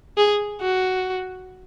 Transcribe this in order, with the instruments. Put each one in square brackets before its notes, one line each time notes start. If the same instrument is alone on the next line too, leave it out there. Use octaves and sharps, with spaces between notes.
[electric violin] G#4
F#4